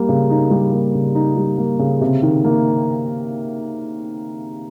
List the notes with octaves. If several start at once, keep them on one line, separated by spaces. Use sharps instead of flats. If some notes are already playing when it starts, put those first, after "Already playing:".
Already playing: G3 A#3
C#3
D#4
G3
A#3
C#3
D#4
G3
A#3
C#3
C3
D#3
A#3